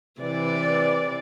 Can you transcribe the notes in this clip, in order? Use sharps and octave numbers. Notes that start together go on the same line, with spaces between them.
C3 E3 D5